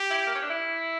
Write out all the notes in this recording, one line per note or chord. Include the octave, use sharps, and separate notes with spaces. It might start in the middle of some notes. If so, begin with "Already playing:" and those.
Already playing: G4
E4
A#3
C#4
D4
E4